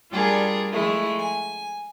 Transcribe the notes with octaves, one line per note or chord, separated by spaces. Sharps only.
G3 D4 F4 G#4 A#4
F3 G#3 A3 E4
G#5